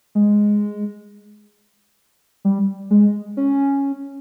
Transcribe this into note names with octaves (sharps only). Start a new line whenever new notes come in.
G#3
G3
G#3
C#4